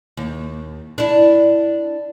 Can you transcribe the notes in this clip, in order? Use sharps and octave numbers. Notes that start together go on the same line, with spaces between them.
D#2
D4 E4